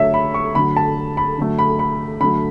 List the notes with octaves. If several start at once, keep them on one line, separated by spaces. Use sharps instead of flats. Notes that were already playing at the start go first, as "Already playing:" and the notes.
Already playing: D3 F#3 A3 C#5 E5
B5
C#6
D3 F#3 A3 B5
A5
B5
D3 F#3 A3
B5
B5
D3 F#3 A3 B5